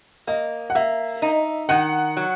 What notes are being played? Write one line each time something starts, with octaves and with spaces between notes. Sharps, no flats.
A#3 D#5
F#5
A#3 E5
D#4
D#3 F#5
F#3